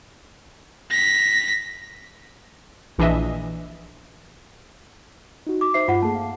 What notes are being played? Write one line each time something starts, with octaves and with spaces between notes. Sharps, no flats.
A#6 B6
A#1 E3 D4 D#5 E5
D#4 F#4
D6
D#4 C5 E5 C7
G2 F4 F#5
A3 A#3 G#4 A5
F5